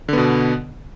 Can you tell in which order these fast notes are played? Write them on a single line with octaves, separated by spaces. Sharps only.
D3 B3 B2